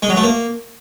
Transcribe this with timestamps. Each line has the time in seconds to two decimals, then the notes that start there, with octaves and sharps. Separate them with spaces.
0.02 G#3
0.09 F#3
0.16 A3
0.23 A#3